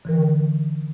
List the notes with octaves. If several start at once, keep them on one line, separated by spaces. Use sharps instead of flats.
D3 E3 A#4